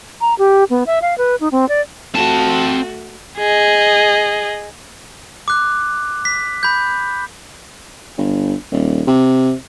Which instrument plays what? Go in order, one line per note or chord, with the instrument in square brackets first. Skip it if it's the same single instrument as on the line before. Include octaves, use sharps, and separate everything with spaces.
[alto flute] A#5
G4
B3
E5
F5
B4
D#4
C4
D5
[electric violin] A3 F#4 [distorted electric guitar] C4 A5
[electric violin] G#4 D#5
[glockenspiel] D6 F#6
B6
B5 G6
[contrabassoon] G1
D#1
C3